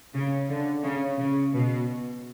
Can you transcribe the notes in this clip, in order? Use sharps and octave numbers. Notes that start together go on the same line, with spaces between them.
C#3
D3
C#3
C#3
B2